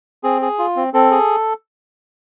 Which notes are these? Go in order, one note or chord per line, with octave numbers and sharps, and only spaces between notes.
C4 G#4
G#4
F4
C4
C4 A4
G#4